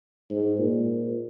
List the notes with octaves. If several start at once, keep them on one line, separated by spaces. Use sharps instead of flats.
G#2
A#2